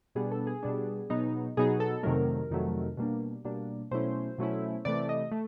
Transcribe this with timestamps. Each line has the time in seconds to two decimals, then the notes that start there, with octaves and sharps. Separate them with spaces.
0.15 B2 G3 B3 D4 G#4
0.32 A4
0.47 G#4
0.63 B2 G3 B3 D4
1.10 B2 F#3 B3 D#4
1.57 B2 F#3 B3 D#4 G#4
1.80 A4
2.03 F2 C3 D#3 F#3 A3 A#4
2.50 F2 C3 D#3 F#3 A3
2.97 B2 G3 A#3 D4
3.45 B2 G3 A#3 D4
3.91 B2 F#3 A3 C#4 E4 C5
4.38 B2 F#3 A3 C#4 E4
4.85 C3 E3 A3 D5
5.09 D#5
5.32 A3